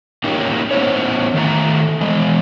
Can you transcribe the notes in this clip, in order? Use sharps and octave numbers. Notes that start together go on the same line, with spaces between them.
A#3 C#4 D#4 E4 G4
B3 C#4 D#4 E4 C5 C#5
D#3 A3 E5 A#5
E3 G#3 D#5